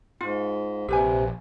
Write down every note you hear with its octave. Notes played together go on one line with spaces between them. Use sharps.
G#2 F4
A#1 C3 G4 B4 G#5